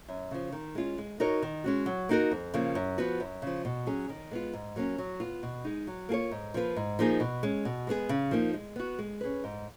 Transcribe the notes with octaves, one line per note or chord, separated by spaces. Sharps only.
F#2
C#3 F3
D#3
G#3 C#4 F4
G#3
D#4 F#4 A#4 C#5
D#3
G#3 C#4 F#4
F#3
A#3 D#4 F#4 A#4
F2
C#3 F3 A#3
F#2
F3 B3 F#4 B4
F#2
C#3 F3
B2
F#3 C#4 G#4
D#3
G#3 B3 F4
G#2
F#3 A#3 C#4
F#3
B3 F4
B2
G#3 D#4
F#3
A#3 F4 G#4 C#5
G#2
F3 A#3 F4 B4
G#2
F3 A#3 D#4 G#4
B2
G#3 C#4
B2
G#3 B3 F4 G#4
C#3
F3 A#3 D#4
G#3
B3 F#4
G#3
C#4 G#4 B4
G#2